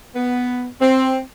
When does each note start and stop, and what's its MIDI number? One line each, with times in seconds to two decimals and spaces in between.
0.15 0.66 59
0.80 1.18 60